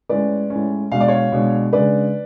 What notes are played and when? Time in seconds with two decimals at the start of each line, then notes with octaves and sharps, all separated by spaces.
0.09 A2 G#3 C#4 B4 D5
0.50 A2 G#3 C#4
0.92 B2 G#3 D4 F5
1.00 D5
1.08 C#5 F5
1.32 B2 G#3 D4
1.73 C#3 G#3 D4 B4 D5